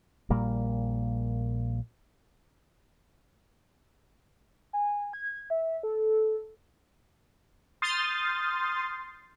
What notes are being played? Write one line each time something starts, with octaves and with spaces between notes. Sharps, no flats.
A#1 A#2 G3 A#3
G#5
G#6
E5
A4
C6 D#6 F6 G6 A6 C7